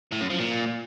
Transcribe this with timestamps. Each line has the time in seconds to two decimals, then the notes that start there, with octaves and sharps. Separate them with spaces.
0.12 A2
0.21 F#2
0.30 F3
0.39 A#2